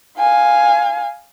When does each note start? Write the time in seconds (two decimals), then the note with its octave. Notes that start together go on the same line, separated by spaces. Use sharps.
0.18 F5 G#5